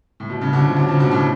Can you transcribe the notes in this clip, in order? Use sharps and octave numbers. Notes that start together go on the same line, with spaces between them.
A2
B2
A2 C#3
B2 D3
C#3 F3
D3 F#3
C#3 F3
B2 D3
A2 C#3